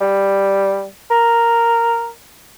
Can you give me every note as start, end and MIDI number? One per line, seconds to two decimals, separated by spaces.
0.01 0.85 55
1.11 2.10 70